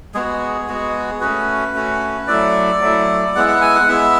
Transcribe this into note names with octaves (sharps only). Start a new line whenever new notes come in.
G#3 B3 F#4 G#4
G#3 B3 F#4
A3 C#4 F#4 B4
A3 C#4 F#4
F#3 A3 E4 D5
F#3 A3 E4
G#3 B3 E4 F#5
F#5
G#5
F#5
G#3 B3 E4 E5